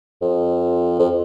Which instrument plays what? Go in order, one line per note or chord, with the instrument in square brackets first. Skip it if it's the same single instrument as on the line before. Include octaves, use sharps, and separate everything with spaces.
[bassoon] F2
F2